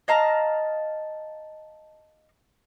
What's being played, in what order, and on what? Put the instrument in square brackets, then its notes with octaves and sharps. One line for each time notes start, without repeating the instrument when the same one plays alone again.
[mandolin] D#5 F5 A5 A#5